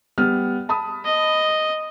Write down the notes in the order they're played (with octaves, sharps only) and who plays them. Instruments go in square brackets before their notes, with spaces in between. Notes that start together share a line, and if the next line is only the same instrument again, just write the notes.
[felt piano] G3 B3 F6
A5 B5 D#6
[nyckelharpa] D#5